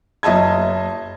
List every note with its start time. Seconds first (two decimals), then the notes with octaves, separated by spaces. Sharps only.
0.23 F#1 D#5 E5 A5 G#6